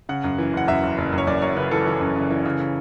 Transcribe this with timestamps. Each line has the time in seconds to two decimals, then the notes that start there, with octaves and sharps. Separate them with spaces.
0.09 C#3 F#5
0.24 F#2
0.38 E3
0.53 F#1 F#5
0.68 F#2 E5
0.83 F#1
0.98 F#1
1.12 F#2
1.18 C#5
1.27 F#2 D5
1.42 F#2 C#5
1.56 C#3 B4
1.71 E3 A4
1.86 E3
2.01 F#2
2.16 C#3
2.30 E3
2.45 C#3
2.60 C#3